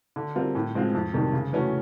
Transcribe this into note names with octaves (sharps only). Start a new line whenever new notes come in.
D3
G3 C4 F4 A#4
A2
F3 G#3 C4 F4
F2
C3 D#3 G3
C#3
E3 A3 C#4 F#4